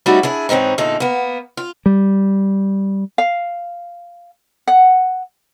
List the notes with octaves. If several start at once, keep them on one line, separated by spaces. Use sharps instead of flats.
G3 A3 C#4 D#4 E4 F#4
D4 E4 G#4
G#2 E3 C4 C#4 D#4
E2 A#2 D3 D#4 A4
A#3 B3
F4
G3
F5
F#5